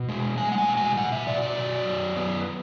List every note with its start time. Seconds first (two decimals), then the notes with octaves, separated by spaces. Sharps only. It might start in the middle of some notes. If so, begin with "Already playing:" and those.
Already playing: B2
0.09 G#3
0.38 G#3 G#5
0.52 F#5
0.58 G#5
0.68 B2
0.77 G#5
0.97 B2 F#5
1.12 E5
1.26 B2 D5
1.42 D5
1.57 F#3
1.86 F#2
2.16 B3